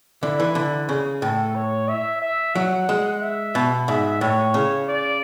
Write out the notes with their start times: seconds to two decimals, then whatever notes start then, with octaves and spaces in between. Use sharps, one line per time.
0.23 D3 E4
0.40 E3
0.55 D3
0.89 C#3 G#4
1.22 A2 A4
1.55 C#5
1.89 E5
2.22 E5
2.55 F#3 F#5
2.89 G#3
3.22 E5
3.55 B2
3.88 G#2 E5
4.21 A2 C#5
4.54 C#3
4.88 D5